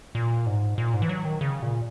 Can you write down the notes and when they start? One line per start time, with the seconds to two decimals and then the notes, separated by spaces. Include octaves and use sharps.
0.15 A#2
0.46 G#2
0.78 A#2
0.94 G#2
1.02 E3
1.09 F#3
1.25 D#3
1.41 C#3
1.63 A#2